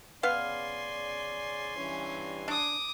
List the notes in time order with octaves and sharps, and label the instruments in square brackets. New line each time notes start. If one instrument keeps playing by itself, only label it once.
[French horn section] C#3 D5 [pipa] B3 F5 [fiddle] G#5 C6
[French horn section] G2 E3 [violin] C#4
[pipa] D4 [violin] D6 D#6